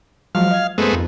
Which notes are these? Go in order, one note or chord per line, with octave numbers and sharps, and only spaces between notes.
F3 F#3 G#3 F5
D#5 G#6
F#2 C3 G#3 A3 B3 C5
F2 G#2 A#3